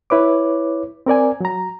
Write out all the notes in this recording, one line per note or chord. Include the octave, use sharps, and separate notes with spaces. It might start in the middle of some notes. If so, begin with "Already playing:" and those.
E4 B4 C#5 D6
C4 A#4 D5 G#5
F#3 A#5